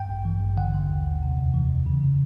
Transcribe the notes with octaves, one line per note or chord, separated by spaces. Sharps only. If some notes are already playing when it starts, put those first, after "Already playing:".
Already playing: G2 G5
A1
E3
A1
D3 F#5
D3
D#2
D#2
C3
F2
E3
F2
C#3